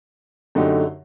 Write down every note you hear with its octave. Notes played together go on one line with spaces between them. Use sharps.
F#2 D3 A3 D#4 G4